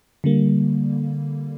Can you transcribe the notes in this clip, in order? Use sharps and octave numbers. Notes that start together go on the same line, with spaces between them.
D3 G3 A#3